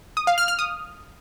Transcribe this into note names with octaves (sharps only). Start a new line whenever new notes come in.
D#6
F5
F6
F6
D#6